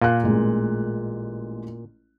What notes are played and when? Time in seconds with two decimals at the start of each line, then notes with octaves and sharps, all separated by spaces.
0.01 A#2 F5 F#6
0.23 A1 G#3